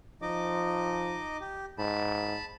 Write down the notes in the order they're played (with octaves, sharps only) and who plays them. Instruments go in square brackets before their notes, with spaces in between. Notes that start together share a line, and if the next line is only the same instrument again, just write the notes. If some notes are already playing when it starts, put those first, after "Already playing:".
[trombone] F3 [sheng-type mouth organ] D#4 D#5 D6
[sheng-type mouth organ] G4
[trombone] G#2 [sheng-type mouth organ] A5 B5